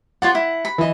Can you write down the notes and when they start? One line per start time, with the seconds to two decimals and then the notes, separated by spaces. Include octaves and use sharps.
0.22 F4 C#5 D5 F#5
0.35 E4
0.65 B5
0.78 E3 D#5